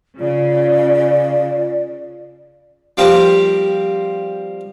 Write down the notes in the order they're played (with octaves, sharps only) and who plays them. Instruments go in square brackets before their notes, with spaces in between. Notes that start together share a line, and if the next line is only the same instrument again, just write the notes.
[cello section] C#3 [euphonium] F4 [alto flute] D5
[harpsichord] F3 G3 A#3 C4 G4